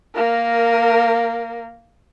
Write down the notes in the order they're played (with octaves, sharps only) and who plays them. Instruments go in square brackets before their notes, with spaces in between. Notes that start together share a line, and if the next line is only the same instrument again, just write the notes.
[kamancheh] A#3 A#4